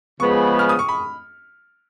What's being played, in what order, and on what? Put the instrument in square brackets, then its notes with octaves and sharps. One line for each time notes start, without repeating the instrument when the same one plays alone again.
[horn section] C#3 F3 G#3 B3 [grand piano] C#6
[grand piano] F6
D#6
C#6
B5